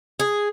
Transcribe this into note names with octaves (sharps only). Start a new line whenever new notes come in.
G#4